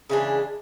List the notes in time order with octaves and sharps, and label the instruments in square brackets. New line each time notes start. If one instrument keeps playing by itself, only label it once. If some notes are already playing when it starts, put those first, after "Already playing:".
[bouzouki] C#3 E3 G#3 D4